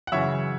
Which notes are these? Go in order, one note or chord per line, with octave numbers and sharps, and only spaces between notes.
F#5
F#2 C#3 E3 C#5 E5